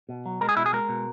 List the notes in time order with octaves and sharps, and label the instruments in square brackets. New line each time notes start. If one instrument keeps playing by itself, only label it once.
[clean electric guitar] B2
F#3
G#3 A#4
G#4
B2 E4
G#4
G#3 A#4
B2